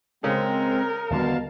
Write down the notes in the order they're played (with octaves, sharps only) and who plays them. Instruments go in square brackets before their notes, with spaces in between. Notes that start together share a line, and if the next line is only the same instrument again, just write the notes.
[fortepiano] C#3 [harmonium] G#3 C4 [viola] A#4
[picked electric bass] D#2 D3 G3 [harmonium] B2 F5 A5